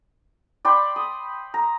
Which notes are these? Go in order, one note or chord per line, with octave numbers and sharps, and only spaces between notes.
D5 G5 B5 C6
D#6
A#5